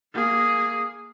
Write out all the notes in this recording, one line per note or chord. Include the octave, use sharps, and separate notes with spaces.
A#3 G#4